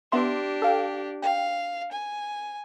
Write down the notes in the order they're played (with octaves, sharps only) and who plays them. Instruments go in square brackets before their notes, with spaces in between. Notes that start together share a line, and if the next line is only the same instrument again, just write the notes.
[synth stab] B3 E5 C6 [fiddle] D4 G4
[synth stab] A4 F5 G5
[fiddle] F5 [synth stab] G5
[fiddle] G#5